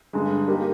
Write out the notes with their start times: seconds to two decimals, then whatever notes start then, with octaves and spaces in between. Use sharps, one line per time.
0.13 G2 D3 G#3
0.48 A#3 D#4 G4 A#4